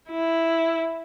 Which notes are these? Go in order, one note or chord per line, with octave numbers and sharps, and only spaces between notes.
E4